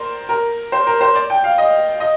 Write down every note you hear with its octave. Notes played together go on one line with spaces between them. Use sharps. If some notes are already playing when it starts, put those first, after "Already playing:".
Already playing: A#4 C5 D5
A#4
C5
A#4
C5
D5
G5
F5
D#5
D#5